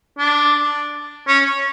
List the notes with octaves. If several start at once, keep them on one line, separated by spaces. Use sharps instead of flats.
D4
C#4